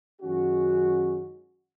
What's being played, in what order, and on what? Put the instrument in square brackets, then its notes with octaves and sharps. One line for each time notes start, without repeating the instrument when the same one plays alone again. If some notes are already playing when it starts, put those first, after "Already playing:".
[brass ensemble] F#2 D#3 G#3 C#4 F#4